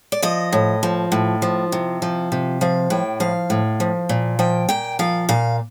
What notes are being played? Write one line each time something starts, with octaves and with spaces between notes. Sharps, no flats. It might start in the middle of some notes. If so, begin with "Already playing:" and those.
D5
F3 D#5
A2
F3
A2
F3
C3
F3
C3
F3 F5
A2 G5
F3 F5
A2
F3
A#2
F3 G5
A#2 G5
F3 F5
A#2 F5